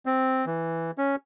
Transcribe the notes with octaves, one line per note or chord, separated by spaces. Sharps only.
C4
E3
C#4